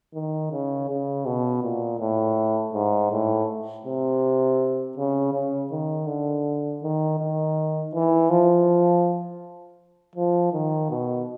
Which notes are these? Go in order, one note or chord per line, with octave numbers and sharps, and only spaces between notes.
D#3
C#3
C#3
B2
A#2
A2
G#2
A2
C3
C#3
C#3
D#3
D3
D#3
D#3
E3
F3
F3
D#3
B2